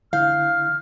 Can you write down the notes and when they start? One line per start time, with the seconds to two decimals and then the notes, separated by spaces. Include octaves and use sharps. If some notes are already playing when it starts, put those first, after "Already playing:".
0.13 D3 E4 F5 F6 G6